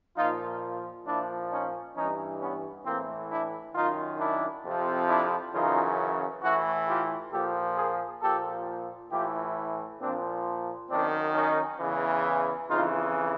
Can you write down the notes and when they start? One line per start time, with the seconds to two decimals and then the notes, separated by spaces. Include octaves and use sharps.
0.17 A#2 F3 D#4 F4
1.06 A#2 F3 D4 E4
1.51 C#4 D#4
1.96 G2 E3 C#4 D#4
2.41 B3 C#4
2.85 A2 E3 A#3 C4
3.30 D4 E4
3.75 F#2 D#3 D#4 F4
4.20 D4 E4
4.64 F2 C3 F3
5.09 D4 E4
5.54 F#2 C#3 E3 D#4 F4
6.43 A2 E3 E4 F#4
6.88 F4 G4
7.32 A#2 F3 G4 A4
7.77 G#4 A#4
8.22 A#2 F3 G4 A4
9.12 A2 E3 F4 G4
10.01 A#2 F3 C4 D4
10.90 F#2 D#3 C4 D4
11.35 C#4 D#4
11.80 E2 C#3 E3
12.69 F2 C#3 E3 D#4 F4